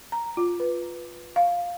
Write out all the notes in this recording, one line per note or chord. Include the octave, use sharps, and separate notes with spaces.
A#5
F4
B4
F5